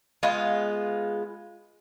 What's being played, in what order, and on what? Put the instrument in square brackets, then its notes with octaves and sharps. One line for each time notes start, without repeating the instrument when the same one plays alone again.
[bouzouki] G#3 B3 F4